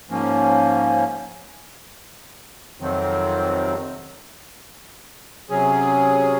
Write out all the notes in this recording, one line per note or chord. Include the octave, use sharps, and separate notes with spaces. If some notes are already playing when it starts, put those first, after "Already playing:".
G#2 F3 A#3 C#4
F2 C3 D#3 F#3 C4
C3 F#3 C#4 G#4